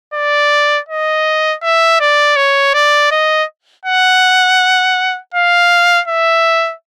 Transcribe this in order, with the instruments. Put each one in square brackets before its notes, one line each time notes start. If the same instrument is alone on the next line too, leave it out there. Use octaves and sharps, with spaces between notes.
[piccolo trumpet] D5
D#5
E5
D5
C#5
D5
D#5
F#5
F5
E5